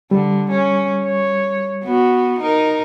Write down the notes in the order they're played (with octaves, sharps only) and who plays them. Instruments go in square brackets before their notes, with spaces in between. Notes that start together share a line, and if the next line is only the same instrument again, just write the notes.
[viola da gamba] D3 [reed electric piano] G3
[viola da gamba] C#4
C#5
B3 F#4
D#4 A#4